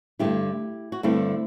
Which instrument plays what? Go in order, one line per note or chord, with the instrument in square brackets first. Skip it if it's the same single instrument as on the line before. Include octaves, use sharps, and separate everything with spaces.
[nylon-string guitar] G2 D3 A3 E4 G4
F#4
G2 D3 A3 C4 E4